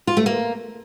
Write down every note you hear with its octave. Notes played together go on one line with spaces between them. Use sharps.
F4
A3
A#3